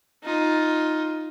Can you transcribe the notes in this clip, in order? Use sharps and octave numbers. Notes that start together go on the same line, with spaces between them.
D#4 F4